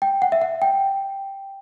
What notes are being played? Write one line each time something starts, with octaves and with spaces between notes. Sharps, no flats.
G5
F#5
E5
F#5
G5